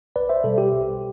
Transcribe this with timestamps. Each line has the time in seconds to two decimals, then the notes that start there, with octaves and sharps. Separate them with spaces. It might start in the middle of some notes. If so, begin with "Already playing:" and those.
0.16 B1 B4 D5
0.29 C5 E5
0.44 B2 G3 A4
0.58 G4
0.73 B1